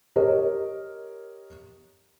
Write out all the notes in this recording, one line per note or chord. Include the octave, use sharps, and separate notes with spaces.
G4 A#4 C#5 D#5